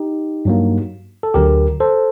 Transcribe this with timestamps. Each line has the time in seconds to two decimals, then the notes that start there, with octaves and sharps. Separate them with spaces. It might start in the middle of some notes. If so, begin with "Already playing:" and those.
Already playing: D#4 G4
0.45 G2 F#3 A#3
1.23 A4
1.34 D2 D3 F#3 G4 A#4
1.80 A4 C5